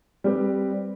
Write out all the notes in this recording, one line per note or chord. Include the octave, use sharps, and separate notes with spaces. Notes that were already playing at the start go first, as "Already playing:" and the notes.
G3 C4 G4 B4